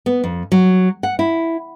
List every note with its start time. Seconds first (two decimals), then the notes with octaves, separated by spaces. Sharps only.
0.06 B3
0.24 F2
0.52 F#3
1.03 F#5
1.19 E4